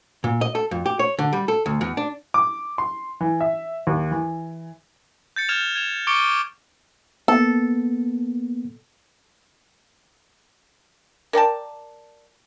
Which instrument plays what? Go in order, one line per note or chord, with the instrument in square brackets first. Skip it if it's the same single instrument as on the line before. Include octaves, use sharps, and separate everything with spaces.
[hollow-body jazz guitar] A#2
D#5
A4
F2
G4
C#5
D3
G3
A4
D2
E2
D4
[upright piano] D6
C6
E3
E5
D#2
E3
[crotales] G6 A6 C#7
F6 G#6 E7 F7
G#6 E7 F7
C#6 D6 A6 C#7 D7 G7
[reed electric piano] A#3 B3 [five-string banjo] A4
[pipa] A#4 D5 G5 A5